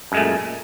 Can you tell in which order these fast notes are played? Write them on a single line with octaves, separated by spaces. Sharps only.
F#2 G#3 A3 A#2